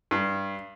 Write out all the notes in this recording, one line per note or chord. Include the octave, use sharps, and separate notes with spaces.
G2